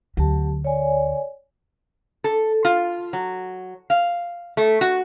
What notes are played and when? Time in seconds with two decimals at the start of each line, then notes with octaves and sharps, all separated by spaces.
0.17 D2 F#3 G4 A5
0.64 C#5 D5 G#5
2.24 A4
2.65 F4
3.13 F#3
3.90 F5
4.57 A3
4.81 F#4